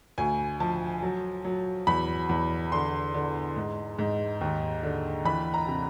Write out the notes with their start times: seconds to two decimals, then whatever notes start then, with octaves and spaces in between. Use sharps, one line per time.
0.18 D2 G#5
0.60 F3 A5
1.02 F#3
1.45 F#3
1.87 E2 B5
2.29 E2
2.72 D3 C6
3.14 D3
3.56 G#2
3.99 G#2
4.41 D#2
4.83 D3
5.25 E3 B5
5.54 A#5
5.68 C3